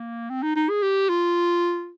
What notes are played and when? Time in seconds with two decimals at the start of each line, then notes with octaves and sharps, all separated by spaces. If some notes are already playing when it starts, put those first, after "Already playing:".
Already playing: A#3
0.30 C4
0.43 D#4
0.56 D#4
0.69 G#4
0.82 G4
1.09 F4